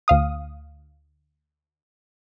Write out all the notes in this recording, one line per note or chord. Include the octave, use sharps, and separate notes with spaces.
D2 F5 D#6